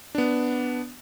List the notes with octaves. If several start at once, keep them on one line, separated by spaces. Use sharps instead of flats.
B3 D4